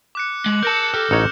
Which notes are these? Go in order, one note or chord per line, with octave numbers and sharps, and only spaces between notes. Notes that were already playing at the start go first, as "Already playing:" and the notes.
D6 F#6 C#7
G#3 F#7
A#4 A5 G6 A#6 E7
G4 A4 F6
A1 D#4 C#5 C#7